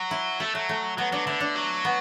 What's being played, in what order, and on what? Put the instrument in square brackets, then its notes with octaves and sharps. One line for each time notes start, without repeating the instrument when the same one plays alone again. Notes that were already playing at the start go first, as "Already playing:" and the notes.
Already playing: [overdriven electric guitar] F#3
[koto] E4
[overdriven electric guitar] A3 [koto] E4
[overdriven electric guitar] F#3 [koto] A3
[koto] A3
[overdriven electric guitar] F#3 [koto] B3
[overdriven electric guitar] F#3 [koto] D4
[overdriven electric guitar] D3 [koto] E4
[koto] D4
[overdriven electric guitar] F#3
[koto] B3